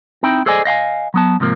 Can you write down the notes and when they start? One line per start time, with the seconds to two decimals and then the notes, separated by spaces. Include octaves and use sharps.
0.23 C4 D#4 E4 G5
0.46 G#4 A4 C5 D5 D#5 G#5
0.65 D#5 F5 G5 G#5
1.14 F#3 B3 A5
1.40 G#2 C3 F3 A#3